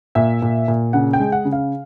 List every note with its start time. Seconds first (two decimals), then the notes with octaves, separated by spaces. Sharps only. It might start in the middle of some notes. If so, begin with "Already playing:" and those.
0.15 A#2 E5
0.42 A#2
0.68 A#2
0.93 C#3 F#5
1.13 G5
1.19 G#3
1.32 F#5
1.45 C#3
1.53 F5